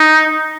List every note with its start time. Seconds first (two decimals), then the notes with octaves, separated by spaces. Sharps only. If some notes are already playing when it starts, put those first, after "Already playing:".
Already playing: D#4